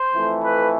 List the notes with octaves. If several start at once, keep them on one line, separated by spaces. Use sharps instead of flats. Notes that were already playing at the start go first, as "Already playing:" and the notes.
Already playing: C5
F2 E3 A3
B4